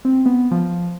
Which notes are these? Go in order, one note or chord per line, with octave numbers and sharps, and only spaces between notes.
C4
B3
F3